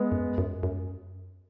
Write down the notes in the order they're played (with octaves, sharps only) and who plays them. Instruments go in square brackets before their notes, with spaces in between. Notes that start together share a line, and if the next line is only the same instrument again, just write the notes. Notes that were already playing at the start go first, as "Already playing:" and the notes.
Already playing: [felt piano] G#3 B3
[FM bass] F#2
F#2
F#2